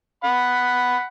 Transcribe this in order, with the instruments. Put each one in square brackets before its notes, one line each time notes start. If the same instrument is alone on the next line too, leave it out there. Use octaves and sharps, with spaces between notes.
[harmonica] F#5 B5